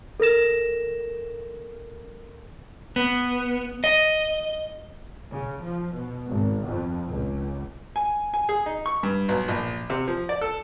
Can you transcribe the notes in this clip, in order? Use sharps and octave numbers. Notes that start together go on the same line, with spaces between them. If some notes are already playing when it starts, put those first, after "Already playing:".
A4 A#4 A#6 E7
B3
D#5
C#3
F3
B2
G#1
F2
C#2
G#5
G#5
G#4
D#4
C#6
G2
B1
A#1
C3
F3
D5
A4